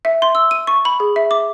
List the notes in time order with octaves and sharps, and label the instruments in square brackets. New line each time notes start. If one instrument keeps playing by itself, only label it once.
[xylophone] E5
C6
E6
D#7
C#6
B5
G#4
E5
D6